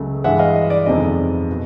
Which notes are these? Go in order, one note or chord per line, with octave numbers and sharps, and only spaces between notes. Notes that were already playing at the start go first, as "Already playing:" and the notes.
Already playing: C#2 C#3 F#3 A3
G2 E3 G#3 E5 F#5
D#5 F5
D#5
D5
F2 C3 D#3 G#3 B3 D#5
B2